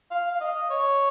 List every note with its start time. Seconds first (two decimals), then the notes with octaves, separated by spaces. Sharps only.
0.11 F5
0.32 F5
0.41 D#5
0.70 C#5